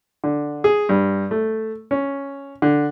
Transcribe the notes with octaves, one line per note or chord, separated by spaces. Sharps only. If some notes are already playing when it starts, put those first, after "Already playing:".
D3
G#4
G2
A3
C#4
D3